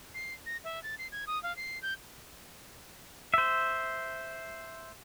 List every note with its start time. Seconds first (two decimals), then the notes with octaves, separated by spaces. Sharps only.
0.14 C7
0.46 A#6
0.64 E5
0.83 A6
0.99 C7
1.12 G#6
1.27 D#6
1.43 F5
1.57 C7
1.82 G6
3.34 C5 E5